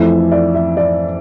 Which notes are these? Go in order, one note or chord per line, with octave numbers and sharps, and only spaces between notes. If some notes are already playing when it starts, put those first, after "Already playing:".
Already playing: F2 E3 A3 E5
D5
E5
D5